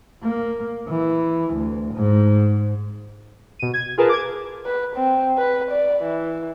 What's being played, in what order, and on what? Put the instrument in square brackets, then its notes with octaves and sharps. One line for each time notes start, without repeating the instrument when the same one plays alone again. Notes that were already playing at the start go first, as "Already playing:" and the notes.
[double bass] A#3
E3
D2
G#2
[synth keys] B2 D#7
G#6
F4 G#4 A#4 B4 A5
D6 G#6
[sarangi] B4
C4
B4
D5
E3